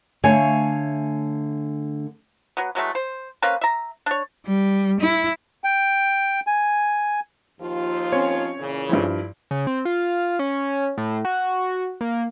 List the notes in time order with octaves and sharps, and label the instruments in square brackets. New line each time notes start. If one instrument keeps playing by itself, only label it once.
[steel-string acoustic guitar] D3 A3 C#5 F5 G#5
[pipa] F#3 B3
E3 F#3 G#3 A3
C5
A#3 C4 C#4 B4
E5 A#5
D4 C#5
[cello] G3
E4
[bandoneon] G5
G#5
[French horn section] D#2 F3 F4
[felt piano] C4 C#4 [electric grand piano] C#5
[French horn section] A#2 C#3 E3
[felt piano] G2 F3 [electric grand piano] E4
[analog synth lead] C#3
C4
F4
C#4
A2
F#4
A#3